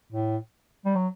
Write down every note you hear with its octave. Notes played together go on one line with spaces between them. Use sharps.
A2
G3
F#3